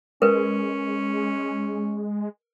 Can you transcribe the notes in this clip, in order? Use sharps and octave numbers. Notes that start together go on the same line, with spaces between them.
G#3 C#4 A#4 B4